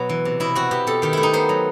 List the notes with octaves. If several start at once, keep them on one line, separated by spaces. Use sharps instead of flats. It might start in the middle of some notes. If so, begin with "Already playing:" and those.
Already playing: B2 F#3 F#4
E3
C3
B2 E4
C4 F#4
B2 G4
B2 A4
D#3 G4
A3 E4
D#4
B3 C5
F#3